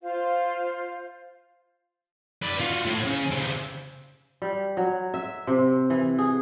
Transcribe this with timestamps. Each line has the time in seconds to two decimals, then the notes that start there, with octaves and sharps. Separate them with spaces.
0.02 F4 C5 F5
2.42 B4 D5
2.60 F4 F#4
2.85 A2
3.04 C#3
3.31 C#3 C4
4.42 G3
4.77 F#3
5.14 E5
5.47 C3
5.90 E3
6.19 G#4